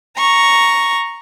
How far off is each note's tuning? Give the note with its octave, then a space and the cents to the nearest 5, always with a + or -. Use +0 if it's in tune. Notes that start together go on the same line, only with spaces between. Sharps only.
A#5 +0 C#6 +0